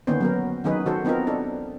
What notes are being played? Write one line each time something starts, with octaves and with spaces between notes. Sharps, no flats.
D3 D#3 A#3 B3 C#4 C5
F#3 B3 A#4
D#3 F#3 C#4 D#4 G#4 B4
D#3 F#4 A4 C5
B3 C4 D#4 F4 A#4
D4 D#4 A4